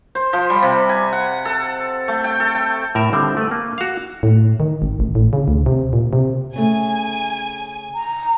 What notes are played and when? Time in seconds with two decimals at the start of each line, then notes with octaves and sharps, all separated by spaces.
0.15 C5
0.33 F3
0.50 G3
0.63 C3
0.89 G#5
1.13 F#5
1.45 A4
2.08 A3
2.24 G5
2.40 A4
2.55 G5
2.95 A2 A#4 E5
3.13 D3 D#3 G3 C4
3.37 A3 B4
3.51 A#3
3.78 F#4 F5
4.23 A2
4.60 D#3
4.82 G#1
5.00 A1
5.15 A2
5.33 C#3
5.48 D2
5.66 C3
5.93 A#2
6.13 C3
6.56 C#3 A3 G#5
7.95 A#5